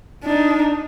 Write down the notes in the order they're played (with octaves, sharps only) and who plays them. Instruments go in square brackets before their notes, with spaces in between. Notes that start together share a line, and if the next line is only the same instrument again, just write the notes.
[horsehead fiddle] D4 D#4